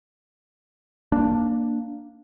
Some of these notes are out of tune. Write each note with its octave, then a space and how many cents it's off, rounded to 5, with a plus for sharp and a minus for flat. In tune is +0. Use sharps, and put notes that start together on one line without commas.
A#3 +0 D4 +0